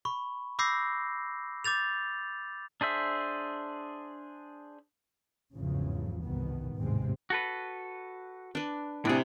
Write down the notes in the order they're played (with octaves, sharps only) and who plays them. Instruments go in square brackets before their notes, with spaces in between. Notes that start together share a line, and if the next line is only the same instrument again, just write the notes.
[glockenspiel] B5 C#6
B5 D6 E6 G6 A#6 C7
D6 G6 A6 F7
[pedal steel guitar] D4 G#4 C5 E5
[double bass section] G#1 E2 G2 C#3 F3 F#3
C2 G2 B2 D#3 B3
G#1 D#2 A2 C3 G#3 C4
[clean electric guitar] F#4 A4 B4
[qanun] D4 B4
[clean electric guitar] A2 D4 G#4 [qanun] C3 E4